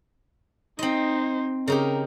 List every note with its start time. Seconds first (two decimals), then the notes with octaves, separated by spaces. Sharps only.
0.79 C4 D#4 C5 D#5
1.68 C#3 D#4 G4 A#4